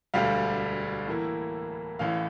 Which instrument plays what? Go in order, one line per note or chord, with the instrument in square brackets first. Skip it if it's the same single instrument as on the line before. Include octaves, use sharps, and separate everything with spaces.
[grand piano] E1 D2 D3 G3 F5
A2 E3 A#3 E4
A1 A2 E3 F5